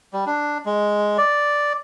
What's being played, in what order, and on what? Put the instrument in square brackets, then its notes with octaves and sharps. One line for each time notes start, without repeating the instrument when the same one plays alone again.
[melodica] G3
D4
G#3
D5